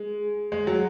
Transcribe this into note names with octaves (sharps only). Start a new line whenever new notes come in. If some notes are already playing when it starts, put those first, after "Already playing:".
Already playing: G#3
G#3
F#3